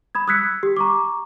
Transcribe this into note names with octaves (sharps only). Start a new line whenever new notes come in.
B5 D#6 G#6
D#6 E6 F#6 G#6 B6 C#7
G4
A#5 C#6 D6